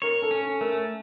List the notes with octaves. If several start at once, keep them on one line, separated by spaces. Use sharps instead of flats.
A#4 C#5
A4
C#4
A4
A3 A#4